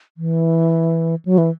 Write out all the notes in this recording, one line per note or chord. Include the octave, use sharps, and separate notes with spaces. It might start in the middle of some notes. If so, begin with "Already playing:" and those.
E3
F#3
E3